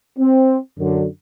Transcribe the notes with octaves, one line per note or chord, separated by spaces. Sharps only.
C4
F#2 D3